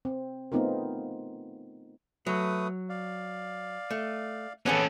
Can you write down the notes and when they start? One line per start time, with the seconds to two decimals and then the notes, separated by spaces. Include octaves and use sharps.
0.05 C4
0.52 A3 B3 C4 D#4 F4 A#4
2.27 F#3 A3 B4 D#6
2.89 D5 F5
3.91 A3
4.66 B3 C#4 G#4 A4 B4 C#5 D6 D#6